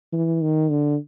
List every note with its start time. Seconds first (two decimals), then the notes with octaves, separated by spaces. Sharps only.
0.13 E3
0.42 D#3
0.70 D3